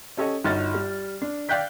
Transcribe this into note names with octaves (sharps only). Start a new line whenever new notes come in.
C#4 G4 A4 C#5 D#5
G1 D#4 F#4 C#5 F6 A6
G3
D4
D5 F5 G5 F#6 G6 B6